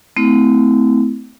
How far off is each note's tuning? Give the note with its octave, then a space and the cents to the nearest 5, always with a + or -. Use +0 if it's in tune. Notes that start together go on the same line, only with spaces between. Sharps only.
A3 -5 C4 -35 E4 -30